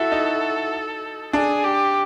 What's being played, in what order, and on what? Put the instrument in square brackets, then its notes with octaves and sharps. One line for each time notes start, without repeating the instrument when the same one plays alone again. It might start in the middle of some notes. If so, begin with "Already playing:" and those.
Already playing: [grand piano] E4 F#4 [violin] A4
[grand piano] D#4
[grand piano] D4 [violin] G#4
[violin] G4